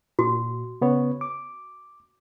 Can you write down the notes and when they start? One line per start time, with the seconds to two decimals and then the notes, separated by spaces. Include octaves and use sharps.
0.19 A#2 F#4
0.81 C#3 B3 C#5
1.21 D6